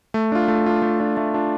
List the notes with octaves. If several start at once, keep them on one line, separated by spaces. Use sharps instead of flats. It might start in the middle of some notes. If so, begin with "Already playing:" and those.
A3
D4 F4
A3
D4 F4
A3
D4 F4
A3
D4 F4